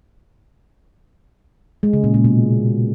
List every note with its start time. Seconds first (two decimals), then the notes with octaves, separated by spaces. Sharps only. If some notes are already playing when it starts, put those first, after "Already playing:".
1.83 G#3
1.93 C#3
2.04 A#2
2.14 A#2
2.24 B2